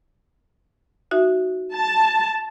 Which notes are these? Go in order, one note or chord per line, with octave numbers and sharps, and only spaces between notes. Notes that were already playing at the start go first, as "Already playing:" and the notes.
D#4 F#4 E5
A5